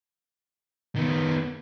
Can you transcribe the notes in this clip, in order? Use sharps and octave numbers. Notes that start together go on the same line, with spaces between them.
D#3 B3